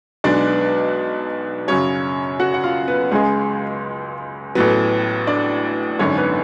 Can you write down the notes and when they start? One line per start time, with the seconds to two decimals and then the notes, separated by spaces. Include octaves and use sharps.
0.24 B1 B2 G#3 B3 D4 D5
1.68 F#2 C#3 F#3 C#4 C#5
2.40 F#4 F#5
2.54 F#5
2.64 F4 F5
2.88 B3 B4
3.12 C#2 C#3 G#3 G#4
4.55 A1 A2 F#3 B3 B4
5.27 D4 D5
5.99 G#1 F#2 D3 C#4 C#5
6.17 B3 B4